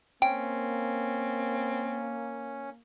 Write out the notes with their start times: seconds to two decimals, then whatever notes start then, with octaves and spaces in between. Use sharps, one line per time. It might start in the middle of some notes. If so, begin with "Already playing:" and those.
0.22 A#3 C4 C#4 G5